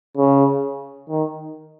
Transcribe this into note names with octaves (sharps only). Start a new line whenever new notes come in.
C#3
D#3